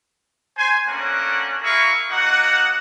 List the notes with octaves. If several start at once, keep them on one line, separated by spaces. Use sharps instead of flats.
C5 G#5
A3 A#3 C#4 D4 F#4 F#5
E4 G#4 A#4 E5 F5 C#6
A#3 D#4 F#4 F#5